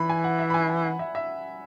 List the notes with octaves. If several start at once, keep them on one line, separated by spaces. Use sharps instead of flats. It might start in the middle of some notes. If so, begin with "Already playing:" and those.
Already playing: E3 B5
G#5
F#5
E5
B5
G#5
G#5
F#5
E5
E5